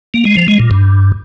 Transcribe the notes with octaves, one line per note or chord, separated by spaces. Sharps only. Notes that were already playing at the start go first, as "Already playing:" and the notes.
A#3
G#3
F3
G#3
A#2
G2